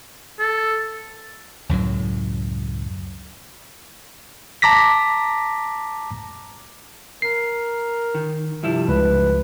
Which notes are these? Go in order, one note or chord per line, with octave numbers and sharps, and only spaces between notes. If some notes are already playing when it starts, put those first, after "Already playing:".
A4
C#2 F#2 A2 F#3
A5 A#5 D6 A#6 B6
A#4 C7
D#3
G2 C3 F3 E4
C#2 B4